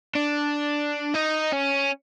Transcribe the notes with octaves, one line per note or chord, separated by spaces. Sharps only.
D4
D#4
C#4